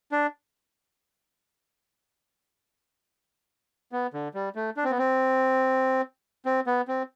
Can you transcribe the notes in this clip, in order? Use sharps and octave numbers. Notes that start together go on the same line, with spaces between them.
D4
B3
D3
G3
A3
D4
C4
B3
C4
C4
B3
C4